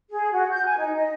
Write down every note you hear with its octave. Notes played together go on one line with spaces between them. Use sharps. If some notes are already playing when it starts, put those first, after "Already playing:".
G#4
F#4
G6
G#5
D#4
D#5